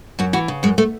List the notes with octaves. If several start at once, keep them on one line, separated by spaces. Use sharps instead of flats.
F#2 F#4
E3 F#4
C#3
F#2 G#3
A3